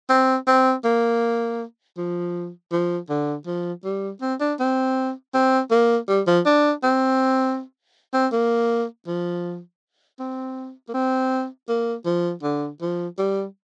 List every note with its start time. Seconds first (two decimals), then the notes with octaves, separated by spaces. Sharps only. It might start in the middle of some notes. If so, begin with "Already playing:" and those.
0.10 C4
0.47 C4
0.85 A#3
1.97 F3
2.72 F3
3.10 D3
3.47 F3
3.84 G3
4.21 C4
4.41 D4
4.59 C4
5.34 C4
5.71 A#3
6.08 G3
6.27 F3
6.46 D4
6.83 C4
8.14 C4
8.32 A#3
9.07 F3
10.20 C4
10.89 A#3
10.94 C4
11.69 A#3
12.06 F3
12.43 D3
12.82 F3
13.18 G3